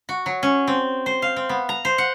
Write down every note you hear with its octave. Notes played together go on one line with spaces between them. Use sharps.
F#4
F#3
C#4
C4
C5
F5
C4
B3
A#5
C5
F#5